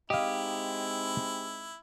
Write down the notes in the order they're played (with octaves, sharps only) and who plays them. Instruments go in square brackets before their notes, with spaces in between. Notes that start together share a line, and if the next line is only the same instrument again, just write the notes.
[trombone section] G#3 C4 D#4 [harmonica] E4 [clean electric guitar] G4 [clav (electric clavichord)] D#5 F5